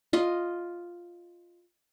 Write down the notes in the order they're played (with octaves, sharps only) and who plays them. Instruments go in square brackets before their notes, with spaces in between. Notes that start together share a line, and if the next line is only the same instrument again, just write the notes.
[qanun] F4 D#5